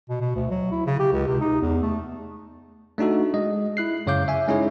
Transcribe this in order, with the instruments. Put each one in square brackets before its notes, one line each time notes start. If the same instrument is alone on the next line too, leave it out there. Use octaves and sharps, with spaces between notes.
[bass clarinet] B2
B2
D2
F#3
E4
C#3
G4
C#2
C3
D#4
E2
A3
[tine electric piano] A3 D4 D#4 F#4 A4
G#3 D#5
E4 F#6 C7
F#2 C#3 C#5 F5 D6 G6
E5 G#5
G#3 C#4 D#4 E4 G#4 C#5